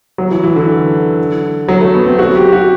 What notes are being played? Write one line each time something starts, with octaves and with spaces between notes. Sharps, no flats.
F#3
E3
E3
D3
F#3
A3
B3
C4
F#4
G4
F#4